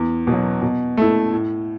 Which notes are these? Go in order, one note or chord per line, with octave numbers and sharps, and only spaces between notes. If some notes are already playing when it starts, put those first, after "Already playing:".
Already playing: E2
B2 F#3
B2
A3 E4
A2